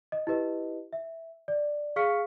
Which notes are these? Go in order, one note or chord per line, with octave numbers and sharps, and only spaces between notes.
D#5
E4 G4 B4 D#5
E5
D5
G#4 F5 C#6 F6 B6 C#7